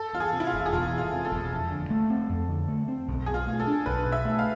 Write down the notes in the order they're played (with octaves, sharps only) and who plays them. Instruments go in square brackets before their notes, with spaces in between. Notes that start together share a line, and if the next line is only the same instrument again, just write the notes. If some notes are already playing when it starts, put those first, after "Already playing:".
Already playing: [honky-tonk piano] A4
[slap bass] E2 [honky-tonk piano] F4
[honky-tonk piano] G#4
[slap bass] C3
[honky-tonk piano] E4
F4
[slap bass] E1
[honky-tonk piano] G#4
[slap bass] E1 [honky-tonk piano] F4
[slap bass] E2
[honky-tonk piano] F4
[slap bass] C3
[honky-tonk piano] A4
[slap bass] E1
F2
D3
A3
C4
F2
D3
A3
C4
B1
[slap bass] B2 [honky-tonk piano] G#4
[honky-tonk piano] F4
[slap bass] A3
[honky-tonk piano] A4
[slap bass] D4
[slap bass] B1 [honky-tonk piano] B4
[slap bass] B2
[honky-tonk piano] E5
[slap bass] A3
[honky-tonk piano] F5